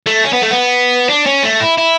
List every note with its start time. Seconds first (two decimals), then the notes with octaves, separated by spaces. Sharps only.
0.06 A3
0.24 C#4
0.33 B3
0.42 A3
0.51 B3
1.09 D4
1.26 C#4
1.43 A3
1.60 E4
1.78 E4